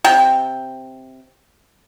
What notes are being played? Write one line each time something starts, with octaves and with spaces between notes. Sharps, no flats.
C3 G5